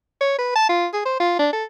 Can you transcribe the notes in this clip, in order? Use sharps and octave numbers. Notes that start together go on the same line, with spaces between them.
C#5
B4
A5
F4
G#4
C5
F4
D4
A4